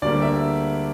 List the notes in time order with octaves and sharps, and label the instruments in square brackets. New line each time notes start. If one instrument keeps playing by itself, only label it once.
[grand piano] D2 D3 G3 A#3 D5
E5